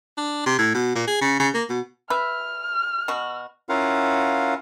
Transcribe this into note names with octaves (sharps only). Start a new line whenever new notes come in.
D4
C3
A2
B2
A#2
G#4
C#3
C#3
A#3
B2
B4 E5 F6
B2 F#4
C#4 E4 F4 A#4 F5 F#5